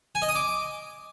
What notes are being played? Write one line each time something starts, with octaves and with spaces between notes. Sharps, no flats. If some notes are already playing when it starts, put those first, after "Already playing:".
G#5
D#5
D#6
D6